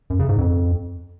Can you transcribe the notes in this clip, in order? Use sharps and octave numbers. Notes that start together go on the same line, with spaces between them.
F#2
C#3
G#2
F2